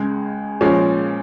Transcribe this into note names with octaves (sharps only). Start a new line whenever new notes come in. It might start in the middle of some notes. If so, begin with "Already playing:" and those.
Already playing: C#2 C#3 G#3
A#2 F3 G#3 C#4